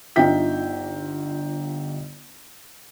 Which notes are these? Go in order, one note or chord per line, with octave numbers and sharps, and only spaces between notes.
G1 D#4 F4 E5 G5 B6